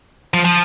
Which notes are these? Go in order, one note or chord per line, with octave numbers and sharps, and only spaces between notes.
F3
F3